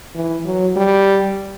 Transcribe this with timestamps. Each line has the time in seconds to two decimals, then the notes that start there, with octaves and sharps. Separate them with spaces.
0.15 E3
0.46 F#3
0.76 G3